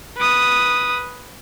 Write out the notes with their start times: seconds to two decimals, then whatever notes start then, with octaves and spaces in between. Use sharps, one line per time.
0.18 B4 D#6